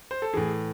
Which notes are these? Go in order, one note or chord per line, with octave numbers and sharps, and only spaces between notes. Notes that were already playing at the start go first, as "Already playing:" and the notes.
C5
A4
A2 E3 G#4